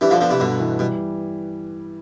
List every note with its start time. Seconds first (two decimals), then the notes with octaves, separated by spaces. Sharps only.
0.01 E3 G3 D4
0.10 D3 F3
0.21 D3 F3 B3
0.30 C3 E3
0.40 G2 B2 D3
0.60 E3
0.79 B2 G3